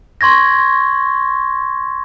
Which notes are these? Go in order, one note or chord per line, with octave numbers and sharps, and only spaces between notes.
C6 C#6 G#6 A#6